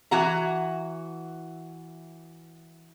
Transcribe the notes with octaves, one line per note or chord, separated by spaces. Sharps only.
E3 F#4 F#5 A#5